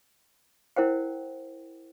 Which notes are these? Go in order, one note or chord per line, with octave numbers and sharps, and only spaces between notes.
E4 A#4 C5 F#5 G5